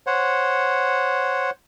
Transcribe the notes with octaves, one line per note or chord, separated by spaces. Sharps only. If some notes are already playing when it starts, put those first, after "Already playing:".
C5 C#5 F#5